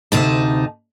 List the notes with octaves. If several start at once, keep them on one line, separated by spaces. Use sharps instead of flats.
D2 C3 D#4 A5